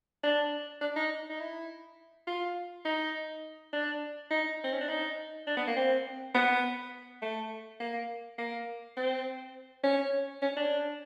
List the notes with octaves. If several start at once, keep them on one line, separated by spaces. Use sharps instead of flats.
D4
D4
D#4
D#4
E4
F4
D#4
D4
D#4
C4
C#4
D4
D#4
D4
B3
A#3
C4
B3
A3
A#3
A#3
C4
C#4
C#4
D4